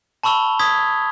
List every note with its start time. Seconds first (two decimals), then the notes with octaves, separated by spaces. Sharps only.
0.23 A5 B5 C#6 E6 F7 G7
0.59 C6 D#6 G#6 B6